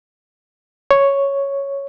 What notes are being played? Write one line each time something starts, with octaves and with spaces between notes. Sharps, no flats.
C#5